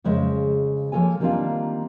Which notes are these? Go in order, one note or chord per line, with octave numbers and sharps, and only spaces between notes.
F2 C#3 G#3 C5 E5
F3 A#3 A4 C#5 G#5
D#3 G3 A#3 C4 D4 F4